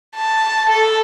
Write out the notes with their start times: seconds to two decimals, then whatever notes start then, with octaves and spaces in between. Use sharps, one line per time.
0.15 A5
0.69 A4